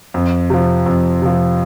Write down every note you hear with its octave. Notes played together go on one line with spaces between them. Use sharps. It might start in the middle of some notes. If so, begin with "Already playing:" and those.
F2
C3 F3
F2
C3 F3